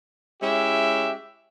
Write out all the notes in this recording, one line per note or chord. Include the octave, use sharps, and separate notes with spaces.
G#3 C#4 E4 G4 E5